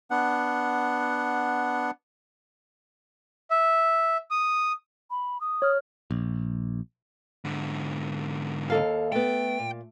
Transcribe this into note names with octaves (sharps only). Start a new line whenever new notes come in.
B3 D4 F#5
E5
D#6
B5
D#6
C#5 F6
A#1
G#2 D3
D#2 A4 F5
A3 B3 G5
A#2